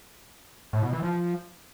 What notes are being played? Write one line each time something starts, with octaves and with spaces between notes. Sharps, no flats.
A2
B2
E3
F3